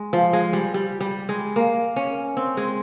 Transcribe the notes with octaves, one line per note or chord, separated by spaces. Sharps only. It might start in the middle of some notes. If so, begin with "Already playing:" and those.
Already playing: G#3
F3
G#3
G3
G3
G3
G#3
A#3
C#4
C4
G#3